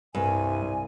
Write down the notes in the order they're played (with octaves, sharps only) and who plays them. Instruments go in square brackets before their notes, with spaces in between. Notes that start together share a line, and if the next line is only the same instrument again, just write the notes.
[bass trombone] C2 [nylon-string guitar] G2 [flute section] G#5